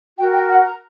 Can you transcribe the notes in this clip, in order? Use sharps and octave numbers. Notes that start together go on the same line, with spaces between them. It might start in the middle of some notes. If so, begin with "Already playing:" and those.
F#4 A#4 G5
G5
F#5
A#5